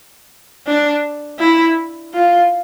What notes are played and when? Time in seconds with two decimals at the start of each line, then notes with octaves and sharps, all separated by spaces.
0.67 D4
1.39 E4
2.14 F4